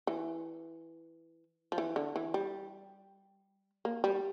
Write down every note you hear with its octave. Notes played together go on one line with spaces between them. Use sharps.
E3
F3
E3
D3
E3
G3
A#3
G3